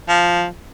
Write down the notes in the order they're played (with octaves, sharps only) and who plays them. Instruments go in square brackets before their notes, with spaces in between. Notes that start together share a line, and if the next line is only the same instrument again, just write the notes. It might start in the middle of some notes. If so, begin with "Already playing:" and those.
[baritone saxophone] F3